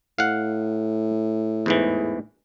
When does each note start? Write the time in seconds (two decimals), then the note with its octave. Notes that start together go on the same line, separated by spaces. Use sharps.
0.19 A2 F5 F#5
1.66 E2 G#2 E3